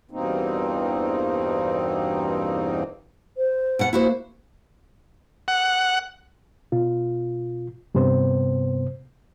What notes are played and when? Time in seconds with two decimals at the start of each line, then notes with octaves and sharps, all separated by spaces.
0.11 E2 G2 B2 A#3 C4 D#4
3.37 C5
3.79 B2 F#5
3.93 A#3 E4 F#4 C5
5.48 F#5
6.72 B2 F4
7.95 G2 C3 B3 C5